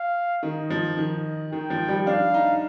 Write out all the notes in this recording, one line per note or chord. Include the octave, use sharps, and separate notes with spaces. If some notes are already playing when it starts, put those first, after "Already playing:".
Already playing: F5
D#3 D#5
F3
D#3 D#5
D#3 G5
F3
G3
D4 F5
D#4